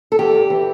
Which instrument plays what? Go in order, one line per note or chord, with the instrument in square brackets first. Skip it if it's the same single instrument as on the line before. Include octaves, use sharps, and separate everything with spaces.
[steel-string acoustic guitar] A4
E2 G4
E2
E3